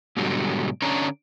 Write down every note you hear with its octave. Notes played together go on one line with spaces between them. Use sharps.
G#2 B2 D3 F#3 G3
D3 C#4 D4 C#5 A#5